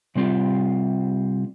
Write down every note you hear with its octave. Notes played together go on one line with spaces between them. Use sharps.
C3 G3 C4 F4